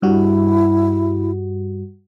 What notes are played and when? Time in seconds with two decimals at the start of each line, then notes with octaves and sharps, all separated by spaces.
0.02 G2 G3 E4 F#4